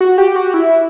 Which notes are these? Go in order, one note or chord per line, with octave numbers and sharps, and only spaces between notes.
F#4
G4
F#4
E4